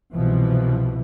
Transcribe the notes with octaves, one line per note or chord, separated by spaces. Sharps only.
C2 B2 E3 F3